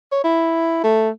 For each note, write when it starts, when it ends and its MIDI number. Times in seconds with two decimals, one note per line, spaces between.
0.12 0.22 73
0.24 0.82 64
0.84 1.09 57